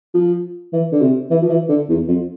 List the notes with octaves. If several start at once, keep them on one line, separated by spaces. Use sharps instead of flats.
F3
E3
D3
C3
E3
F3
E3
D3
E2
F2